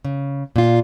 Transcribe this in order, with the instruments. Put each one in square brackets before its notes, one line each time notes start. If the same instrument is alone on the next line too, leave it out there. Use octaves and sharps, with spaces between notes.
[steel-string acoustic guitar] C#3
A#2 F4